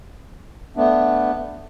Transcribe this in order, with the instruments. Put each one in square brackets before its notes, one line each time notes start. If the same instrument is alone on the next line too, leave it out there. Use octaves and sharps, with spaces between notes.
[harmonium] A3 B3 D4